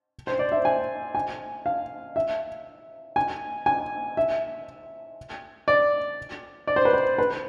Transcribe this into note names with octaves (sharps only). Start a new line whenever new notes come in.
C5
D5
E5
G#5
G#5
F5
E5
G#5
G#5
E5
D5
D5
C5
B4
C5
B4